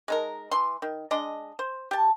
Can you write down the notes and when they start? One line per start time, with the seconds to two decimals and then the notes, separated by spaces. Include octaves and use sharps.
0.08 G#3 D#4 A#4
0.51 E3 C6
0.82 D#3
1.11 G#3 D4 D#5
1.59 C5
1.91 G4 A5